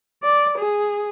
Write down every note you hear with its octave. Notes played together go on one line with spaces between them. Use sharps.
D5
G#4